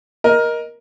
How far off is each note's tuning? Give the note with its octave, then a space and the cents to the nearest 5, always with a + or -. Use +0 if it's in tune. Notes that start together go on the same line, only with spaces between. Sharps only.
A#4 +15 D#5 +0